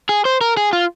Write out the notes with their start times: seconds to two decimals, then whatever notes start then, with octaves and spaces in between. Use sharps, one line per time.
0.09 G#4
0.25 C5
0.41 A#4
0.57 G#4
0.73 F4